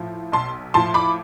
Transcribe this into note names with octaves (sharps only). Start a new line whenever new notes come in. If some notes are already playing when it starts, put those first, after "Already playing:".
Already playing: A2 F3
B1 A5 C6
A2 F3 A5 C6
B5 D6